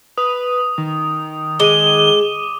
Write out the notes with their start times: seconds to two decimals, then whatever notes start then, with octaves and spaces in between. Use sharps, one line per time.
0.18 B4 D#6
0.78 D#3
1.60 G#3 D6 D#7 G7